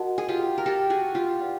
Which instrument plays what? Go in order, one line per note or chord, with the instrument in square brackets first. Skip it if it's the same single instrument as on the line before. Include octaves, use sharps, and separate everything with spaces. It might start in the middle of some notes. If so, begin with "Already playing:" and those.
Already playing: [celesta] F#4 A#4 D#5 F#5 A5
[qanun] G#4
F4 G4
A#4
G4 A4
F#4 G#4
F4 G4
[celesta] B4 D5 F#5